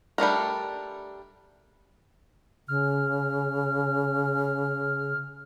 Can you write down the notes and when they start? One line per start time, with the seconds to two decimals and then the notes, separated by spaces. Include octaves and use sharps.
0.18 G3 A3 D4 A#4
2.68 C#3 F6